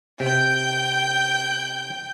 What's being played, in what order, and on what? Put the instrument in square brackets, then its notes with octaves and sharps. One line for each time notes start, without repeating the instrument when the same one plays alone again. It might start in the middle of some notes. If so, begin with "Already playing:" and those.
[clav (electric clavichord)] C3 [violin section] G5 G6